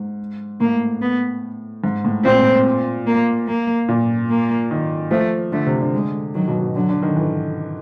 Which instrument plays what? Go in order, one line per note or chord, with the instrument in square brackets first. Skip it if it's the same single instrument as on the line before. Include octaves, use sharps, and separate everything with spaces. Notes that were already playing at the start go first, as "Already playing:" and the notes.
Already playing: [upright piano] G#2
[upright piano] A2 [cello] A#3
[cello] B3
[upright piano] G#2
A2
[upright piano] A#2 [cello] C4
[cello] A#3
A#3
[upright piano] A#2
[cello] A#3
[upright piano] D#3
[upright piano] F3 [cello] A3
[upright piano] D3 [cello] A3
[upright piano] C3
D3
[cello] G#3
[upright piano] D#3 [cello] F#3
[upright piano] B2
B2
[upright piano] D3 [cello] F#3
[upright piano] D3
D#3
E3